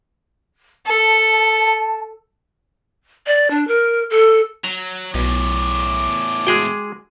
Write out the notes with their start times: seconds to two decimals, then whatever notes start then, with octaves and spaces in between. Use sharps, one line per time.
0.87 A4 A5
3.27 D5
3.51 D4
3.68 A#4
4.10 A4
4.64 F#3 A#5
5.14 B1 E2 A2 D6
6.47 G#3 F#4 G#4 G5